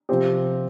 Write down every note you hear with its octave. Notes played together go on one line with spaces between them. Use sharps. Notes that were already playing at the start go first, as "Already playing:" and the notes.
C3 F3 C4 G4